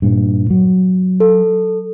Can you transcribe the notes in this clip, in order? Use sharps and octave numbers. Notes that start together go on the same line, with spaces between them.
G2 A#2
F#3
A4